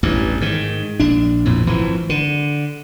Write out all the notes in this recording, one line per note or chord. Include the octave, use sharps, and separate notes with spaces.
A1 E2 G2
G#2 D#3
A#1 D4
A#1 F2 A2
G#1 E3 F3
D3